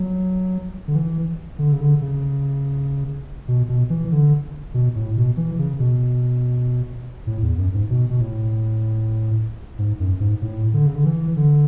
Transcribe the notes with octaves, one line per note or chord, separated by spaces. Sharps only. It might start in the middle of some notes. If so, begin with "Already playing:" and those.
Already playing: F#3
D3
E3
D3
C#3
D3
C#3
B2
B2
E3
D3
B2
A2
B2
E3
C#3
B2
A2
E2
F#2
G#2
B2
B2
A2
G#2
F#2
G#2
A2
D3
C#3
D3
E3
D3